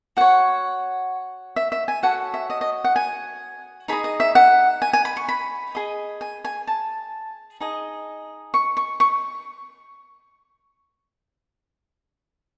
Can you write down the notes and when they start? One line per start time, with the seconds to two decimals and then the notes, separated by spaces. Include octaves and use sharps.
0.17 F#4 C#5 F#5
1.56 E5
1.72 E5
1.88 G#5
2.03 F#4 A4 C#5 F#5
2.34 E5
2.50 D#5
2.61 D#5
2.84 F#5
2.96 G#5
3.88 D#4 G#4 D#5 B5
4.04 D#5
4.20 E5
4.35 F#5
4.82 G#5
4.93 G#5
5.05 B5
5.17 C#6
5.29 B5
5.75 G#4 D#5
6.21 G#5
6.45 G#5
6.67 A5
7.60 D#4 G#4 D#5
8.54 C#6
8.77 C#6
9.00 C#6